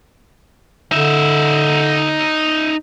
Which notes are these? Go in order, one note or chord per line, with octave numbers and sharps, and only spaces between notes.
D3 D#4 E5